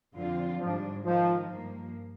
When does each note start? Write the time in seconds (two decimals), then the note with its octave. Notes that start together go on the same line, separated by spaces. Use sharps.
0.14 F2 D3 F3 C4 F4
0.60 G#2 F3 G3 D4
1.05 D#3 F3 G#3 D#4
1.51 G2 F3 A#3